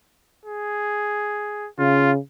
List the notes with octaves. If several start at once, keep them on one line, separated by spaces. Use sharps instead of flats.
G#4
C#3 F4